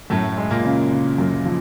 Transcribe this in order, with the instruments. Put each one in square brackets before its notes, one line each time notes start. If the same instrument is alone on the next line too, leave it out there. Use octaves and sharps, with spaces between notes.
[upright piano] F#2 [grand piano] A2 A3
[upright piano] G#3
[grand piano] A#2 A#3
[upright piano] C#3
C#3
F#2
F3